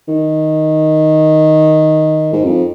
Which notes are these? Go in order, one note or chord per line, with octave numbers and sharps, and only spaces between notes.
D#3
G#2
F2